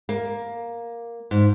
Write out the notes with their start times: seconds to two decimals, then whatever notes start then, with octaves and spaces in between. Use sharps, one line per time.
0.09 A#3
1.31 G#2